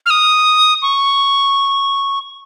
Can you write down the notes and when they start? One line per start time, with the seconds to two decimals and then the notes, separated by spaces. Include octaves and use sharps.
0.06 F6
0.10 D#6
0.82 C#6